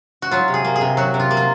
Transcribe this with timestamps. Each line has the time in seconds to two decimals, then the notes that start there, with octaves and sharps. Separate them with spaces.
0.22 F#4
0.31 F#3 F4
0.48 C3
0.54 G#4
0.64 A#3
0.76 G#4
0.81 C3
0.97 F#3 F#4
1.14 C3
1.20 F4
1.31 A#3
1.37 F4